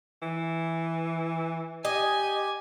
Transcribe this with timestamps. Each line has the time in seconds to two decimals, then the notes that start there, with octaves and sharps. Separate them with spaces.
0.22 E3
1.85 G4 D#5 G#5